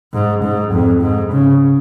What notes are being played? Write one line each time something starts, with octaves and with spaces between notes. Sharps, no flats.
G#2
G#2
F2
G#2
C#3